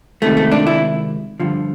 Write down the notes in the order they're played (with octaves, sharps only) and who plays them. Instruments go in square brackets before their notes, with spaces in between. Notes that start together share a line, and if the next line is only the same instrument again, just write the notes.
[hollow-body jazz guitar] C#2 C3 D#3 A3
A3
D4
E4
G2 D3 F3